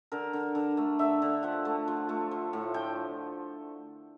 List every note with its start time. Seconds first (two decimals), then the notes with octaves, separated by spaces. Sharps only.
0.12 D3 A#4
0.33 D3
0.55 D3
0.77 A3
0.99 D3 E5
1.22 D3
1.43 F3 F#5
1.65 A3
1.88 F3
2.09 A3
2.31 F3
2.53 A2
2.74 F3 G5